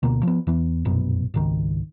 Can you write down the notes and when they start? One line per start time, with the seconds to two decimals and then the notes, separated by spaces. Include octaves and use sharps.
0.03 D2 B2 A#3
0.23 F3 B3
0.47 E2 E3 B3
0.85 F1 A#1 F#2 B2
1.34 G#1 C#2 D#3